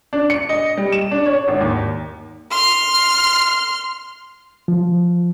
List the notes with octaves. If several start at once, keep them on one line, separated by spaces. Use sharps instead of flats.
D4
C#7
D#5
G3
E7
D4
C#5
G#1
D#2
C6 F6
F3